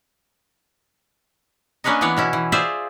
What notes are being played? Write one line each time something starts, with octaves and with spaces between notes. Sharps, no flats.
A#3 C#4 D4 B4 C#5 D#5
E3 B3 D4 C#5 D5
B2 C#4 E4
E3
F4 G#4 C5 D5 E5